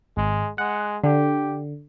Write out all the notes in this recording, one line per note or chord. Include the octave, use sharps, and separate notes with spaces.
G#1 G#3
G#3 F#5
D3 G4